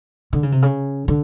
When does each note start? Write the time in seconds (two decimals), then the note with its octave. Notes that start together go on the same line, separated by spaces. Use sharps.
0.33 D3
0.43 C#3
0.52 C3
0.62 C#3
1.08 D3